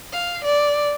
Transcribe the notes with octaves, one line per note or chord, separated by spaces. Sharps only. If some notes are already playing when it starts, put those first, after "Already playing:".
F5
D5